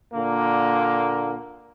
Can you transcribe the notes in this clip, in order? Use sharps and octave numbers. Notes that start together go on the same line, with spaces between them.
A#2 D3 A#3